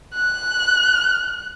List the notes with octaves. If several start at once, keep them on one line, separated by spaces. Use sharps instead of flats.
F#6